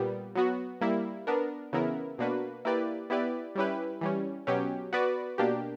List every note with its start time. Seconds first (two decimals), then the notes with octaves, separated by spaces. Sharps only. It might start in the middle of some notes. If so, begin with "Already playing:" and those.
Already playing: A#2 G3 B3
0.35 F#3 B3 F#4
0.81 G3 A#3 E4
1.27 B3 D4 A#4
1.73 C#3 E3 B3 E4 A#4
2.18 B2 A#3 D4 F#4 B4
2.65 A#3 E4 G4 B4 D5
3.10 B3 E4 G4 B4 D5
3.55 G3 C#4 E4 G4 B4
4.01 E3 G3 C#4
4.47 B2 F#3 C#4 G4
4.93 B3 F#4 B4 D5
5.38 B2 A#3 D4 G4